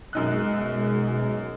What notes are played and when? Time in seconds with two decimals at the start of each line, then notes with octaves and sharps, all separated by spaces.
0.13 F#2 B2 G#3 D#4 F#6